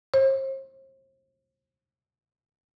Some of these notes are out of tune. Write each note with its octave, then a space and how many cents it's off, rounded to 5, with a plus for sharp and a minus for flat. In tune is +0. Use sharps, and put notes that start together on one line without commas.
C5 +40